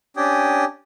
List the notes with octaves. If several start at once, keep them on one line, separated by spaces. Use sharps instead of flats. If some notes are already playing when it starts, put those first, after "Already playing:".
C#4 D4 G4 G5 G#5 D#6